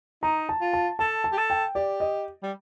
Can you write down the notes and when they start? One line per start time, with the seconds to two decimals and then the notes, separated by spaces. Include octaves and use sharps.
0.23 D#4 A#5
0.49 A5
0.61 F4
0.73 A5
0.99 A4 A5
1.24 A5
1.32 G4
1.38 A4
1.50 G5
1.75 G4 D5
2.00 D#5
2.43 G3